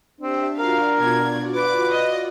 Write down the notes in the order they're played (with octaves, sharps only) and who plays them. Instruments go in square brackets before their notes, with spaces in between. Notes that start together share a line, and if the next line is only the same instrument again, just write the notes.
[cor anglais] C4 [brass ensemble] D4 [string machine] G4 E5
[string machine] F4 F#4 D5 [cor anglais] A#4 [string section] F5
[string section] B2 G#6
[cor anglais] B4 [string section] D6
[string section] D#5